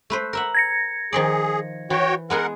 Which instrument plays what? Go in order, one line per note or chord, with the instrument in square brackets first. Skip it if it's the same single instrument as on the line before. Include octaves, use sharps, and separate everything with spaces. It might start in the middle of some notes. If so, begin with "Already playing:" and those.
[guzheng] A3 B4 C5
A#4 E5 F#5
[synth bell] G#6 A#6 C#7
[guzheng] D#3 F3 D5 [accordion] G#4
[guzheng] E3 [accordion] F#4 C#5 G5
[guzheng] G#3 B3 G#4 [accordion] A#4 F#5